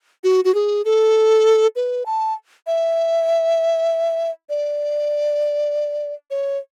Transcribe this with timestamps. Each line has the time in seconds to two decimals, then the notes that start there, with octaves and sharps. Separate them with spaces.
0.24 F#4
0.45 F#4
0.55 G#4
0.85 A4
1.76 B4
2.06 A5
2.67 E5
4.49 D5
6.31 C#5